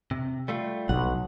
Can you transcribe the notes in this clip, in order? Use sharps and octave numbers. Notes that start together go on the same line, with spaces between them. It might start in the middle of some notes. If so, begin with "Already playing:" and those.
C3
G3 A3 F4
B1 F#5